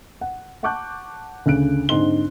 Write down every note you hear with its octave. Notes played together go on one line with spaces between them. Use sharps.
F#5
F#5 A5 C#6 D6 F#6 G6
D2 C#3 F#6 D7
G#2 D3 C4 D#5 C6 G7